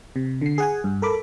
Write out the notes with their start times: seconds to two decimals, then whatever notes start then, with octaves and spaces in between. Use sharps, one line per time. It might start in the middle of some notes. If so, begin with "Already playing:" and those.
0.16 C3
0.41 D3 C7
0.58 G#4 F#5 G#5
0.84 G2
1.02 A4 A#4 B5 D6